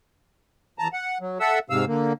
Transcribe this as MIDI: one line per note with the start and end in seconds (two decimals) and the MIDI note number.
0.79 0.88 40
0.79 0.88 81
0.79 0.88 82
0.93 1.18 78
1.21 1.38 54
1.40 1.59 69
1.40 1.59 76
1.40 1.59 78
1.40 1.59 88
1.70 1.85 44
1.70 1.85 48
1.70 1.85 77
1.70 1.85 88
1.88 2.13 50
1.88 2.13 58